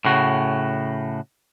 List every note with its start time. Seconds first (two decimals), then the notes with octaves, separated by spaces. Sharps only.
0.05 A2 C#3 F#4